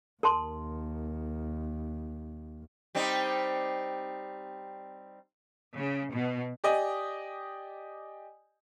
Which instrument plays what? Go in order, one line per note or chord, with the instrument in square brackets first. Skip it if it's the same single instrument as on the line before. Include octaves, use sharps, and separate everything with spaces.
[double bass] D#2 [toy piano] A#4 A5 C6
[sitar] G3 C4 D#4
[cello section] C#3
B2
[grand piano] G4 D5 D#5 G#5